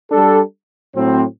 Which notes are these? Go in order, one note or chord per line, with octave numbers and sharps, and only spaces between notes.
G3 D4 A4
A2 F#3 C4